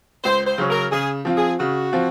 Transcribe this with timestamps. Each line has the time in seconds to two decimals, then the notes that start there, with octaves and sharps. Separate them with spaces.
0.24 C#2 C5
0.46 C5
0.58 C#3 F#3 C#4
0.70 A#4
0.92 C#3 G#4
1.25 F3 C4 F4
1.37 G#4
1.59 C#3 F#4
1.92 F3 C4 F4